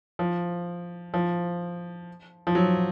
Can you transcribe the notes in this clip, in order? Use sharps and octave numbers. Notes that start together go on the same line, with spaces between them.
F3
F3
F3
F#3